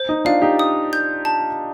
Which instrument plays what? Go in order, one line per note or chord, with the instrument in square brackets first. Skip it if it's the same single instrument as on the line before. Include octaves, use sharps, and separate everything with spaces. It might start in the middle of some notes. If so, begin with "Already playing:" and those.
Already playing: [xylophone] C5
[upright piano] D#4
[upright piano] D4 F4 [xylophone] F5
[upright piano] D#4 G4
[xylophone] D#6
G6
A5